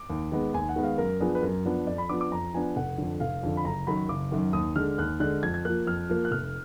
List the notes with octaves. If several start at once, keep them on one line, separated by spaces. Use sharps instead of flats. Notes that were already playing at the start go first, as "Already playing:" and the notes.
Already playing: D6
D#2
D#3 G#3 B3
D#2 G#5
F#5
D#3 G#3 B3
F5
F#2 A#4
F3 B3 D4 G#4
B4
F#2 A#4
F3 B3 D4
F2 D5
B5
F3 B3 D4 D6
D6
F2 A#5
F3 B3 D4 G#5
F1 F#5
F2 D3
F1 F5
F2 D3
B5
F#1 A#5
F#2 D#3 F#3 B5
F#1 D6
F#2 D#3 F#3
D#2 D#6
D3 G#3 D4 F6
D#2 F#6
D3 G#3 D4 F#6
F2 G#6
G#6
F3 A#3 F#6
F2 F6
F3 A#3
F#6
F1 F6